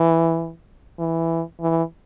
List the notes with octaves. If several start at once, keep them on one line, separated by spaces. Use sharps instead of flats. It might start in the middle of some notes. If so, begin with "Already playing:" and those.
Already playing: E3
E3
E3